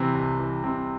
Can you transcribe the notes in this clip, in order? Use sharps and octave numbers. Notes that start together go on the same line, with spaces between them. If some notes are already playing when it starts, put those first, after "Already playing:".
Already playing: C3 E3 C4
C2
E3
C3 C4